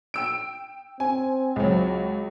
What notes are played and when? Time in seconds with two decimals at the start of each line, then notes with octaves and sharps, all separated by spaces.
0.14 G5 E6 D7
1.00 C4 G#5
1.56 C#2 F#3